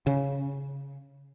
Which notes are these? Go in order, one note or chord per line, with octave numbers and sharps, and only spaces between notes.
C#3